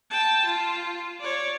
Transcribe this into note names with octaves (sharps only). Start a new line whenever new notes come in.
G5 A5
F4
C#5 D5